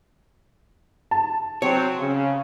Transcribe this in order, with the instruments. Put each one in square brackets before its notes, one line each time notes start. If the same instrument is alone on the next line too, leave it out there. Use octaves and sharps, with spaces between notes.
[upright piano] A5
[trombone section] F#3 C4 [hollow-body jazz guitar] C#5
[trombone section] C#3